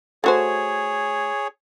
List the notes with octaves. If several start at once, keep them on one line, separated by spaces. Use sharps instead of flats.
A3 F#4 G#4 C5 C#5